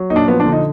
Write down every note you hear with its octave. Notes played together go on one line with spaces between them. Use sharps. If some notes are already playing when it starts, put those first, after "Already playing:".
Already playing: F#3
A#2 D#4
D4
F3 B3
D4
D3
D#4